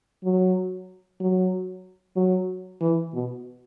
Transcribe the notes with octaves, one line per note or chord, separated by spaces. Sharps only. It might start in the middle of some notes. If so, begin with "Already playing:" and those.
F#3
F#3
F#3
E3
B2